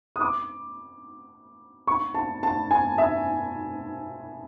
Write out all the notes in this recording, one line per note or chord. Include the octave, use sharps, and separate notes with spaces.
D#6
D6
C#6
A5
A5
G#5
E5